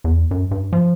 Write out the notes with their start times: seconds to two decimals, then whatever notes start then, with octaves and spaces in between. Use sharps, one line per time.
0.04 E2
0.31 F#2
0.51 G2
0.73 F3